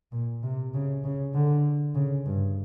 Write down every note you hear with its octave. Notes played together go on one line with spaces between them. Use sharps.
A#2
C3
C#3
C#3
D3
C#3
G2